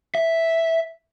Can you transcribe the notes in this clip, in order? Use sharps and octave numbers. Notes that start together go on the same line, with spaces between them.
E5